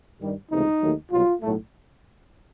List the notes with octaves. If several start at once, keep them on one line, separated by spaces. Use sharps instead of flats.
G2 D#3 G3
C#2 C3 E3 A3 D#4
D#2 D#3 F#3 A3
C2 B2 F#3 F4
B1 A2 F#3 A3